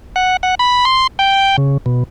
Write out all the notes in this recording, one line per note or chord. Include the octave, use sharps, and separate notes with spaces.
F#5
F#5
B5
C6
G5
C#3
B2